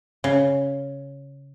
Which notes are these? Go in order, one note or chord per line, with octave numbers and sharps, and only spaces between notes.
C#3